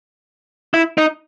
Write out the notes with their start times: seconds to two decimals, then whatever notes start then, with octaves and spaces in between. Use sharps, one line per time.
0.74 E4
0.98 D#4